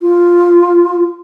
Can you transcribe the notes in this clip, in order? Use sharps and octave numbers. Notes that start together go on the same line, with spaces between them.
F4